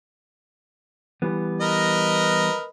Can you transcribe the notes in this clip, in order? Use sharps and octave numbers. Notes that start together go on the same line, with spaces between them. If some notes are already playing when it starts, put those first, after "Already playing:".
E3 G3 B3
A#4 B4 D#5